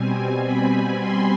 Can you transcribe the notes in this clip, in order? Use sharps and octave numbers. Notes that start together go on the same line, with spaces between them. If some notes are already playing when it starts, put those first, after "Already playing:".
Already playing: B2 G3 C4 G#5
B5
C6